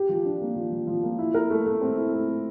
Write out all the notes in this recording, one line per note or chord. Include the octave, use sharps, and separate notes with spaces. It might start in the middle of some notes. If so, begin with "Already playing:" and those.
Already playing: G4
F3
D4
A#3
F3
F3
F3
A#3
E4
A#4
A3
A3
C4
E4
A3
A3